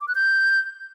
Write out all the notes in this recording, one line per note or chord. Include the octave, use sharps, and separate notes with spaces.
D6
F#6
G6